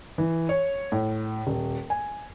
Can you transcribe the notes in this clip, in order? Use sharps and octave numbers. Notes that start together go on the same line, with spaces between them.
E3
C#5
A2
D#1
G#5